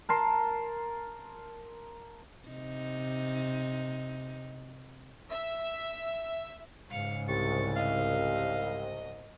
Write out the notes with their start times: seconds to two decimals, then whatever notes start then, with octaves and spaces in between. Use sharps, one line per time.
0.09 A#4 A5 C6
2.48 C3 D#4
5.32 E5
6.91 G#2 C#3 F5 C#7
7.29 C2 C#6 A6
7.76 D#5 F5